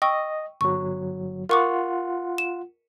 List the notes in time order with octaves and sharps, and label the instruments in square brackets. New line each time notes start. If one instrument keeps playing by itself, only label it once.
[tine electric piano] D#5 [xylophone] G5 C#6 E6
[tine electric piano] G1 F#3 [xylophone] C#6
[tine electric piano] F4 F#5 [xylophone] A#4 C#6 D6
[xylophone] E7